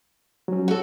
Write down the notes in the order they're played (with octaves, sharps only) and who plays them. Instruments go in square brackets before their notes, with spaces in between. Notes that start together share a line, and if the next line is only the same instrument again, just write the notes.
[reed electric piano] F#3 C#4
[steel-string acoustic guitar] F#4 A4